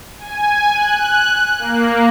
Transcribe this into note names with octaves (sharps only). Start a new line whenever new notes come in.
G#5
F#6
A#3